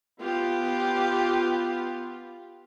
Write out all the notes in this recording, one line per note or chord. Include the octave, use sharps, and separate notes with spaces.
B3 F4 G4